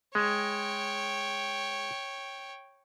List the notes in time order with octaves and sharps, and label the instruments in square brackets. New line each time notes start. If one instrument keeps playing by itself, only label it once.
[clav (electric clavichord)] G#3 [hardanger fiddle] C#5 G5